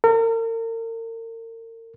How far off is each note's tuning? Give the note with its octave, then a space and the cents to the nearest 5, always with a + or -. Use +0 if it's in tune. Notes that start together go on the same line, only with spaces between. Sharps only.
A#4 -40